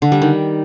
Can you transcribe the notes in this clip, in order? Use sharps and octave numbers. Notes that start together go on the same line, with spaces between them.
D3
G3
D#3